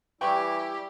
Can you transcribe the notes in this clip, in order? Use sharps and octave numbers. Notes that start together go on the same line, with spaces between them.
E3 G3 E4 G4 G5 C#6